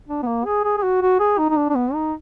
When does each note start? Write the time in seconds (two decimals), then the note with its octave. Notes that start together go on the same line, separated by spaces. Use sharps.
0.08 D4
0.23 B3
0.27 A#3
0.45 G#4
0.64 G#4
0.77 G#4
0.83 F#4
1.02 F#4
1.20 G#4
1.38 D#4
1.50 D#4
1.57 D4
1.70 D4
1.75 B3
1.94 D#4